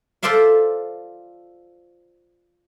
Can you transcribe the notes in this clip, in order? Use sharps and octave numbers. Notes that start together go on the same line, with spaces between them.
F4 A4 C5 D5 E5 F5